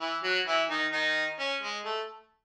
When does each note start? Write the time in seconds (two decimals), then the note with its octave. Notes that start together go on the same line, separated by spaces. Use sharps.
0.01 E3 E4
0.24 F#3 F#4
0.47 E3 E4
0.70 D#3 D#4
0.93 D#3 D#4
1.39 C#4
1.63 G#3
1.85 A3